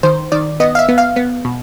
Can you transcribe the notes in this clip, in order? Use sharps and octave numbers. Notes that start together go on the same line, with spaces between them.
D#3 C5
D#3 D5
B3 D#5
F5
E5
B3
F5
B3
B2